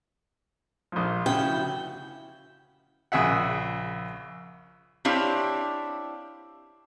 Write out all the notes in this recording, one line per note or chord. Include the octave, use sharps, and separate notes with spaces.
A#1 F3
D2 C#3 E4 G5
A#1 C#3 G#4 E5 F#5
C4 D4 E4 G4 C#5 F5